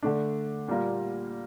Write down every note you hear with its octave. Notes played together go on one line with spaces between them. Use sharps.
D3 A3 D4
A#2 G3 A#3 F4